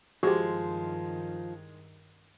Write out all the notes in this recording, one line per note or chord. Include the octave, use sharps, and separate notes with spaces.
G2 D#3 F3 G#3 F#4 G4